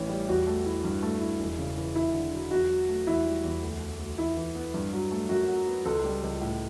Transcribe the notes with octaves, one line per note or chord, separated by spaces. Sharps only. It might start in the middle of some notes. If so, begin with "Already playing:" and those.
Already playing: A1 E3 C#4
G3
E2 F#4
A3
E4
G2
A3
E4
E1
C#3
E3
E1 E4
D3
F#3
E2 F#4
F#3
A3
E2 E4
G3
E2
D2
A3
D2
E2 E4
E3
B3
G2
F#3
A3
F#2 F#4
F#3
B3
C#2 A4
G3
C#2
A2